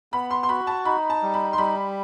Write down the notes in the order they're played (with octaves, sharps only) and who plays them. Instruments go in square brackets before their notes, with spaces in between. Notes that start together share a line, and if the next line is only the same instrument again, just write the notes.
[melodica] B3 [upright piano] B5
[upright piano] C6
C6
[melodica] F#4 [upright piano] B5
[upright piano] A5
[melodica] D#4 [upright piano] B5
[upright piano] A5
[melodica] G3
[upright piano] B5
C6
[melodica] G3 [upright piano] B5